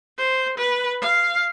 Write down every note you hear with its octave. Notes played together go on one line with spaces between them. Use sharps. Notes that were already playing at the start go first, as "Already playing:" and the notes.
C5
B4
F5